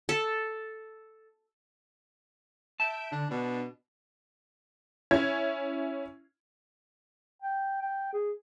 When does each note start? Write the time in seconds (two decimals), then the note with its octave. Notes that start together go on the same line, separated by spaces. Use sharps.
0.09 A4
2.80 E5 A5 G6 D7
3.12 D3 D4
3.30 B2 D4
5.11 C#4 E4 G#6
7.42 G5
7.82 G5
8.13 G#4